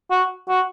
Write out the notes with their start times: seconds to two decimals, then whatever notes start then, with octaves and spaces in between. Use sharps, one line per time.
0.11 F#4
0.49 F#4